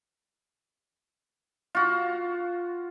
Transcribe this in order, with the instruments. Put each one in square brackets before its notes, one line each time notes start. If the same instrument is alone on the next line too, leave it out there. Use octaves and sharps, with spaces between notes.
[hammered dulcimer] F4 F#4